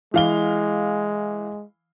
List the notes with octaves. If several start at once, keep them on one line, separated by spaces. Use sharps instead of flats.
E3 G#3 F5 G7